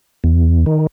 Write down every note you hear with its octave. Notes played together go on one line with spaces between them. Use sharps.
E2
D#3